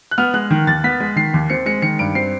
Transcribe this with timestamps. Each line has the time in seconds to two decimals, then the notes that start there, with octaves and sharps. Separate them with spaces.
0.11 F#6
0.18 B3 F6
0.34 G#3 F#6
0.50 D#3
0.67 D#2 A6
0.84 B3 B6
1.00 G#3
1.16 D#3 C7
1.34 D#2
1.50 C4 C#7
1.66 G#3 C#7
1.82 D#3 C#7
1.99 G2 D7
2.15 C4 C7